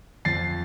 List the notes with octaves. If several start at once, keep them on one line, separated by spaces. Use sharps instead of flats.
F2 A6 C7